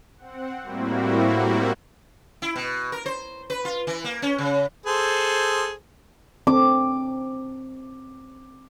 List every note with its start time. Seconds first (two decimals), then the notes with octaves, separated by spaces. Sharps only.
0.17 C4 F#5
0.63 A2 G3 A#3 C4 E4 F#4
2.42 E4
2.56 B2
2.92 A#4
3.06 C5
3.50 B4
3.65 F4
3.87 E3
4.04 A#3
4.22 C#4
4.38 C#3
4.86 G#4 A4 C5
6.47 C4 D6